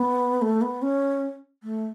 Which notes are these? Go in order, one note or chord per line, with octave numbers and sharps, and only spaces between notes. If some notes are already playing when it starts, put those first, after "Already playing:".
Already playing: B3
A3
B3
C#4
A3